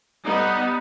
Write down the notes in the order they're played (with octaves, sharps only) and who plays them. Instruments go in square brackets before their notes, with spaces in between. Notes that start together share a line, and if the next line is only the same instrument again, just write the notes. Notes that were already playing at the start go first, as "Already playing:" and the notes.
[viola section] G3 B3 D#4